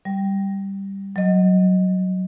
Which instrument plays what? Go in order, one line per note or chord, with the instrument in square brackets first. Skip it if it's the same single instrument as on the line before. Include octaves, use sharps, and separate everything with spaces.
[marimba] G3
F#3 D#5